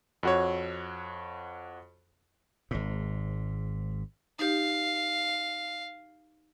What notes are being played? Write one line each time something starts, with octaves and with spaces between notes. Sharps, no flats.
F2 F#4 C#5
G#1 G#2
D#4 G4 F5